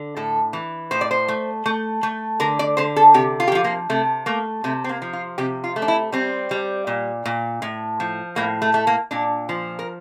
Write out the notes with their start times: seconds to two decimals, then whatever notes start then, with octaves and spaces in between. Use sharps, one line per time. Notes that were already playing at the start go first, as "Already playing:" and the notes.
Already playing: D3
0.17 A2 A4
0.53 E3
0.91 A2 C5
1.01 D5
1.11 C5
1.28 A3
1.66 A3
2.03 A3
2.40 D3 A#4
2.59 D5
2.77 D3 C5
2.96 A4
3.14 C3 G4
3.40 F4
3.47 G4
3.52 F3 F4
3.64 A#3
3.89 C3 A3
4.26 A3 A#3
4.64 C3 A3
4.84 C4
4.89 A#3
5.02 F3
5.13 F4
5.38 C3 G4
5.64 F4
5.76 A3
5.82 D4
5.88 E4
6.12 G3 C4
6.51 G3
6.87 A#2
7.26 A#2
7.62 A2
8.00 F3
8.36 A2 A#3
8.62 A3
8.74 A3
8.87 A#3
9.11 A#2 D4
9.49 F3
9.79 A#4